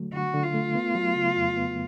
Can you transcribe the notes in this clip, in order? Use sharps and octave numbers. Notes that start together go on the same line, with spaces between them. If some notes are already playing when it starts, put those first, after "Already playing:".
Already playing: D3 F#3 A3
D3 F#4
D3
F4
A3
B3
F#3
C#3
F2
B3